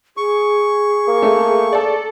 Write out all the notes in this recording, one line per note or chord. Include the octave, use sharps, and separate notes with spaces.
G#4 C#6
A#3
A3
A4 D5